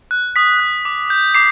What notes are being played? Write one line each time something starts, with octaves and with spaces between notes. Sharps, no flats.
F#6
D#6 B6
F#6
D6
G6
D6 C7